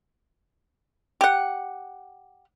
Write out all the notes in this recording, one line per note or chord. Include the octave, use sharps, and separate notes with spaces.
G4 F#5